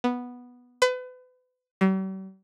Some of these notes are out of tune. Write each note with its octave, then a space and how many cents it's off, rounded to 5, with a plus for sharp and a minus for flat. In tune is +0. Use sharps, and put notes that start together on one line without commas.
B3 -5
B4 +35
G3 -45